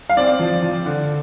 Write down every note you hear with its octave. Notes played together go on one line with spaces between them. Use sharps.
F5
C4 D5
F3
F3
D3